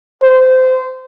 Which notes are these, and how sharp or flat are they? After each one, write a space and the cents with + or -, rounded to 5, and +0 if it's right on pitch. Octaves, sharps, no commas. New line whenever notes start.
C5 -25